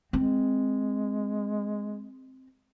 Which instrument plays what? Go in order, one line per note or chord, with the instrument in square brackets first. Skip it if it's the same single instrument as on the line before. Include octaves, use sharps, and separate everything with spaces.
[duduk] G#3 [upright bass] C4